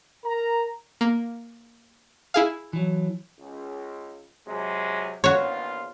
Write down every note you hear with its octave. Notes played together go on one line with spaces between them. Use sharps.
A#4 A#5
A#3
E4 G#4 F5
E3 F#3
C#2
C3 F#3 G#3
A#1 E2 F4 F#4 C#5